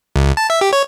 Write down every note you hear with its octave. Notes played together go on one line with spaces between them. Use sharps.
C#2
A5
E5
G4
C#5